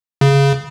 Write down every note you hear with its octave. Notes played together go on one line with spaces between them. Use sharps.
C#3